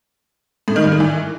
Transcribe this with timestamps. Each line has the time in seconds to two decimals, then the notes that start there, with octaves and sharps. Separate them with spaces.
0.68 A2
0.76 D#3
0.84 G2
0.92 D#3
1.00 E3